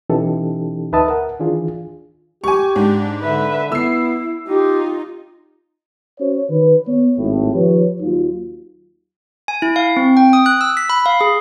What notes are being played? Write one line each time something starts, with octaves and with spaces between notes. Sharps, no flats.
B2 E3 C#4 D#4 G4 A4
D2 D#4 B4 E5 A5 D#6
A#4 F#5
D#3 E3 D4 F4 G#4
G4 G#5 C#6
G#2 D4
D3 B4 E5
B3 E4 E6 C7
D#4 F4 G4
C#4 F#4 C5 C#5
D#3 B4
B3 C#5
G#1 A2
D#3 F3 G4 B4 C#5
D#2 F#3 D#4 F4
G#5
E4
F5
C4
G5
D#6
F#6
E6
B6
B5
F5
G#4